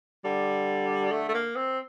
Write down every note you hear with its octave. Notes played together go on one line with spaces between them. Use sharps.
D3 G3
A3
A3
A#3
C4